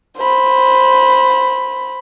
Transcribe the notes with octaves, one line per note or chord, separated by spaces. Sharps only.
C5 B5